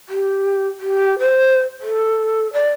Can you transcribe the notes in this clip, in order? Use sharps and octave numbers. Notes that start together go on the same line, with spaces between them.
G4
G4
C5
A4
D5